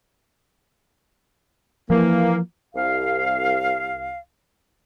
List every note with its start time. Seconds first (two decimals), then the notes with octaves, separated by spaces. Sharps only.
1.90 E3 F3 A#3
2.75 C2 F5